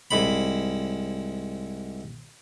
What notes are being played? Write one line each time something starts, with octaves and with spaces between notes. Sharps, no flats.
C2 G#2 B5